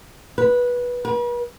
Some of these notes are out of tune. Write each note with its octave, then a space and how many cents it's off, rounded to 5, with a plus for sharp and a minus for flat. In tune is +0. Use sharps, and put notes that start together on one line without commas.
B4 -15
B4 -45